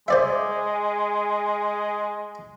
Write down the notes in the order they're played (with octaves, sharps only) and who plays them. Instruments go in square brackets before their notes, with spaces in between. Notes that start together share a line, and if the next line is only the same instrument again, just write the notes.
[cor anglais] G#3 [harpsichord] C5 D5 E5